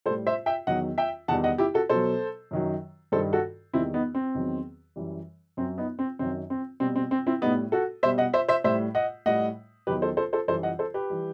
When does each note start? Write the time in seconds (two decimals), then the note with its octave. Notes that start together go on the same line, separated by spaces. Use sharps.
0.06 G3 A4 C5
0.10 A2
0.27 C5 E5
0.46 E5 G5
0.67 E2 D#3 F#3 D#5 F#5
0.98 E5 G5
1.28 E2 D#3 G3 F#5 A5
1.44 D#5 F#5
1.58 E4 G4
1.74 F#4 A4
1.89 B2 F#3 A4 C5
2.51 F#2 D#3 F#3
3.12 G2 D#3 G3 A4 C5
3.33 F#4 A4
3.73 E2 D#3 G3 C4 E4
3.94 B3 D#4
4.15 C4
4.35 E2 D#3 F#3
4.96 F#2 E3 G3
5.57 F#2 F#3 C4
5.78 B3 D#4
5.99 C4
6.19 F#2 D#3 F#3 C4
6.50 C4
6.80 B2 G3 C4
6.96 C4
7.11 C4
7.27 C4 E4
7.41 G3 B3 D#4
7.46 A2
7.72 F#4 A4
8.03 B2 G3 C5 E5
8.18 D#5 F#5
8.33 C5 E5
8.49 C5 E5
8.64 A2 G3 C5 E5
8.95 D#5 F#5
9.26 A2 G3 D#5 F#5
9.87 E2 D#3 F#3 G4 B4
10.02 A4 C5
10.17 A4 C5
10.33 A4 C5
10.48 F#2 E3 G3 A4 C5
10.63 D#5 F#5
10.79 A4 C5
10.94 G4 B4
11.10 E3 G3